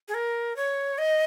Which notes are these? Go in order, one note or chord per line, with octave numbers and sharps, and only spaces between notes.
G#4
A#4
C#5
D#5